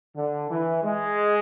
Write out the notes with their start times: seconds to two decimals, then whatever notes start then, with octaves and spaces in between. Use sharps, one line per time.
0.15 D3
0.49 E3
0.83 G#3